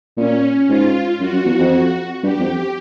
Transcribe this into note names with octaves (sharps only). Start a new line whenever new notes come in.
A#2 C#4
G#2 F4
F#2 F#4
F#2
E2
F2
G2 G4
F2